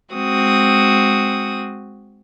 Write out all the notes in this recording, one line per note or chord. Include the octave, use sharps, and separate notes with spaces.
G#3 C4 F#4 D#6